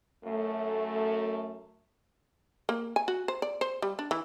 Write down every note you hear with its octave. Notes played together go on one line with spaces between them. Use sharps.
F#2 A3
A#3
G#5
F#4
C5
D5
C5
G3
D4
E3